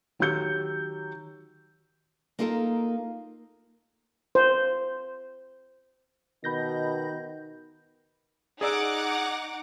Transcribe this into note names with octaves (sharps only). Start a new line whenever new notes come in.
D#3 F#3 G4 E6 G6 C#7
A#3 D#4 F4 A4 A#4 F5
C5
B2 D#3 B5 G6 A#6
D#4 G#4 D5 F#5 D6 E6